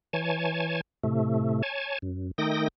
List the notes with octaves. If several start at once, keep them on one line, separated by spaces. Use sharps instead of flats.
E3 C#5 G#5 A5
A2 C3 A3
C#5 G#5 A5
F#2
D#3 A3 D#4 G5 D#6 A#6